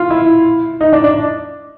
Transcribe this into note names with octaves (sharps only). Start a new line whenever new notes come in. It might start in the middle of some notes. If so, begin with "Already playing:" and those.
Already playing: F4
E4
D#4
D4
D4